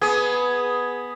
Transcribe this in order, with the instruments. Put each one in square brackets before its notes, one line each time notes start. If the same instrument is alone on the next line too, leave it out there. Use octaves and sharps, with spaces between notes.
[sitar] B3 [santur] G#4 D#6